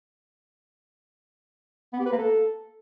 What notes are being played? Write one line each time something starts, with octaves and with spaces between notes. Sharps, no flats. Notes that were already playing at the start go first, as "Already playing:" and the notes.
B3
G4
B4
A#3
A4